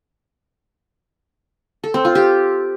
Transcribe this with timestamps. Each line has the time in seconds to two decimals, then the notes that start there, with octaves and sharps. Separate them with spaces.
1.84 A4
1.94 C4
2.05 F4
2.15 G4